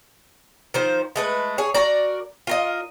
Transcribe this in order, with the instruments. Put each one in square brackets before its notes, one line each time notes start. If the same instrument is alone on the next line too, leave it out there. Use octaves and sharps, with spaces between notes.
[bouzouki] D#3 F3 C5
G#3 A3 B4
G#4 C#5
F#4 A#4 D5
F4 A#4 D#5